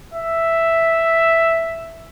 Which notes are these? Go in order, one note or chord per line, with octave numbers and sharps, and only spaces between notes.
E5